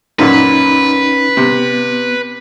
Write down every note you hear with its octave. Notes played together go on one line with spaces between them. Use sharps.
F#2 A#2 C#4 D#4 B4
C3 B3